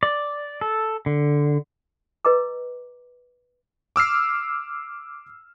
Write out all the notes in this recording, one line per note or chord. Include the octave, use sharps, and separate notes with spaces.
D5
A4
D3
B4 D#5 A#5 D6
D6 E6 F6 C7